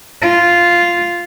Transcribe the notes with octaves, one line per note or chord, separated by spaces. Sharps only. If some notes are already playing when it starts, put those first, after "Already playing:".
F4